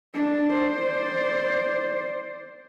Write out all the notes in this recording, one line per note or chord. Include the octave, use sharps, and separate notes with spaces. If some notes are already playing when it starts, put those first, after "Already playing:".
D4
C5 D5